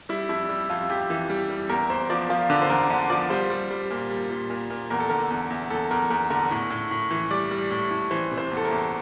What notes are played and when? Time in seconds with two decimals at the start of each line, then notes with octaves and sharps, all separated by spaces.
0.09 G3 E4
0.29 F2 E4
0.49 G3
0.70 F2 F4
0.89 F2 G4
1.10 E3
1.30 G3
1.50 G3
1.70 E2 A#4
1.90 E2 C5
2.10 F3 D5
2.30 F3 F4
2.50 D3 D4
2.62 C5
2.70 E2 A#4
2.90 D3
3.10 F3 D5
3.30 G3 C5
3.50 G3
3.70 G3
3.91 A#2
4.10 G3
4.30 A#2
4.50 A#2
4.70 A#2
4.90 E2 A#4
5.00 A4
5.10 D3 A#4
5.30 E2
5.50 E2
5.70 E2 A4
5.91 E2 A#4
6.10 E2 A#4
6.30 D3 A#4
6.51 A2
6.70 A2
6.91 A2
7.11 E3
7.31 G3 D5
7.51 G3
7.71 A2
7.91 A2
8.11 E3 C5
8.31 C3
8.38 C5
8.51 E2
8.57 A4
8.65 A#4
8.71 E2